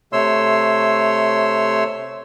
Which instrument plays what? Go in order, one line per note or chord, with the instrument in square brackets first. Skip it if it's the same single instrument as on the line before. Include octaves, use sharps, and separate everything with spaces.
[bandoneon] C3 A3 C#5 C6 E6